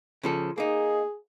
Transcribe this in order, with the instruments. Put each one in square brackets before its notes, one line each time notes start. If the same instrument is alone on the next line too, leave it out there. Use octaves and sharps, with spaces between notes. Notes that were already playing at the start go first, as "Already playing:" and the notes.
[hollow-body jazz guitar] C#3 F3 A4
[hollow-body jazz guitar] A#3 D#4 [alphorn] G#4